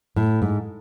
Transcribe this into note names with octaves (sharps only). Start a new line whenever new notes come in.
A2
G#2